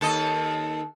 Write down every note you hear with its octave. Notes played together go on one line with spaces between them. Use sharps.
D#2 A4 D#5